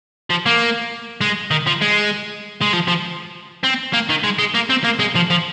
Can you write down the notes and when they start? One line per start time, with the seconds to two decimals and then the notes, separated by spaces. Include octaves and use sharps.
0.30 F3
0.46 A#3
1.21 G#3
1.51 D#3
1.67 F3
1.82 G#3
2.62 G#3
2.73 F3
2.88 F3
3.64 C4
3.94 A#3
4.10 D#3
4.24 G#3
4.39 G#3
4.55 A#3
4.70 C4
4.84 A#3
4.99 G#3
5.15 F3
5.30 F3